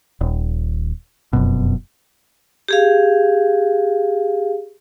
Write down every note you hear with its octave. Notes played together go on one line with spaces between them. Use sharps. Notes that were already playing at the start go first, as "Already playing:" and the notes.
D#1
F1 F#2 B2
G4 G#4 F5